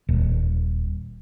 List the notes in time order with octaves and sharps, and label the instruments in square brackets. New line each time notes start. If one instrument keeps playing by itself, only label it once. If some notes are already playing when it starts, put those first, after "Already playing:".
[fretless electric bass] D#1